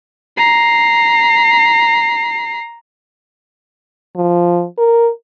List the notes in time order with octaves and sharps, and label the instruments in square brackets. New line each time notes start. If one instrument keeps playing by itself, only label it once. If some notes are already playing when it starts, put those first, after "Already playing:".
[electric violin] A#5 C7
[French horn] F3
A#4